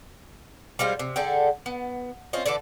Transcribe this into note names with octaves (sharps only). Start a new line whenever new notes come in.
G3 G#3 F4 C5
C3
D3 G#4 A4 G5
B3
C4 C#4 F4 D#5
D3 E3 A4 D5